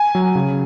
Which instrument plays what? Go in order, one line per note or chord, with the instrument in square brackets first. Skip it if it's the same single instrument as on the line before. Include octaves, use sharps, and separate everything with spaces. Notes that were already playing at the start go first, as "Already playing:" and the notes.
Already playing: [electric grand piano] G#5
F#3
C#3